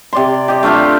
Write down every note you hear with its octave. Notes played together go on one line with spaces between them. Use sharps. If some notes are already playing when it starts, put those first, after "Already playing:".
C3 D5 C6
G4 D#5
A3 D4 F4 G4